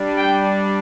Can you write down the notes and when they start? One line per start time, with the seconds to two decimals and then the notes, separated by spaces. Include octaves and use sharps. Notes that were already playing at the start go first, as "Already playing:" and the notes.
Already playing: G3 D4
0.18 G5